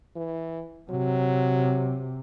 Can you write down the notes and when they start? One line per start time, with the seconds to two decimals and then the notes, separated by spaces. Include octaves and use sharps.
0.16 E3
0.91 C3 F#3